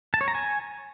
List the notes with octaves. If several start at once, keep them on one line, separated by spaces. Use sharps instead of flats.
A5
C#5
A#5
G#5